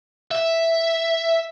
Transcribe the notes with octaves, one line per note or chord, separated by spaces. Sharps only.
E5